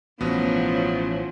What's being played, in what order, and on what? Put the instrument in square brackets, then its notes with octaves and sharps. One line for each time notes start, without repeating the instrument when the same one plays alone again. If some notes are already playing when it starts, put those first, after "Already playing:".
[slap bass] A1 [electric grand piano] B2 B3 [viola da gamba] F3 F#3 E4 [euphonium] C#4